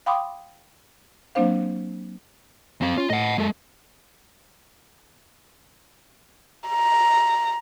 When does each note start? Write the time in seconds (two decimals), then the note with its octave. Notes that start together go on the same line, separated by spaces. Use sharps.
0.06 F5 G5 B5 C6 D6 D#6
1.35 F#3 A#3 C4 D4 C5 F5
2.81 F#2 C4 F5
2.97 C#4 F4
3.10 A2 D#5 F#5
3.38 F#2 G#3 A4
6.68 A#5